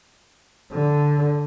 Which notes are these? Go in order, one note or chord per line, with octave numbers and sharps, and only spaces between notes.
D3